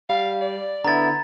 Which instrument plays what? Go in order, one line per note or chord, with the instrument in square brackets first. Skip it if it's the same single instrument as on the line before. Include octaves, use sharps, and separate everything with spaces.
[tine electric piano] G3 [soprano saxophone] F5
[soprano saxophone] D5
[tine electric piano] D3 B3 E4 [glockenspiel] A#5 A6